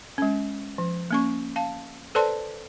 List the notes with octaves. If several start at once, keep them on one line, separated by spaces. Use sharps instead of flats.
G#3 C#4
F3
A#3 C#4 C#6
F5 A5
A4 B4 C5 D5 A5 C6